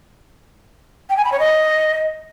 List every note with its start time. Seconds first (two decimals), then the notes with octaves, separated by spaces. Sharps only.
1.09 G5
1.17 G#5
1.24 B5
1.32 C#5
1.39 D#5